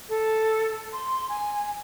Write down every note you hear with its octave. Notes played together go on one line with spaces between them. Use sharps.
A4
C6
G#5